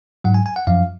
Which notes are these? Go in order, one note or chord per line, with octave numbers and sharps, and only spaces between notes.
G#2 F#3 F#5
G#5
G#5
F#5
F#2 F3 F5